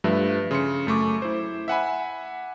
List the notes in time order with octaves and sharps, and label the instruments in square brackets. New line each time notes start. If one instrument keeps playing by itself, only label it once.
[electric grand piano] G2 F3 A3 B4 E5
C#3 C6 C#7
F#2 A3 C#6 D6
E4 C5
E5 F#5 G#5 B5